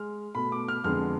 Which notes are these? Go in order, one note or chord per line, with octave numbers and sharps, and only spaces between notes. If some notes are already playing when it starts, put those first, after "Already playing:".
Already playing: G#3 F6
B2 A3 B5
D6
F6
F2 D3 G#3 B3 F6